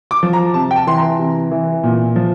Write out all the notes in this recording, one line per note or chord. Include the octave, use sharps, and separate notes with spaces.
D6
F3
A#5
C3 A5
G5
A5
E3 C6
A#5
C3
E3
A#2
F3